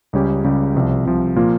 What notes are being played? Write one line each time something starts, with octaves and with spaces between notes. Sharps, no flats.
C#2 C#3 G3 C#4 G4
C#2 C#3 G3 C#4 G4
C2 C3 F3
C2 C3 F3
A#2 F3 A#3 F4